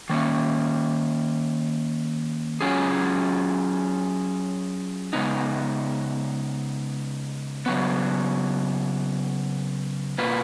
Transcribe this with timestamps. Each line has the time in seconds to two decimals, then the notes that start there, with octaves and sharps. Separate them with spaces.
0.09 D#3 A#3 C#4
2.61 F#3 C#4 F4 G#4
5.13 C#3 G#3 B3 D#4
7.66 C#3 F#3 B3
10.18 B2 A#3 F4 B4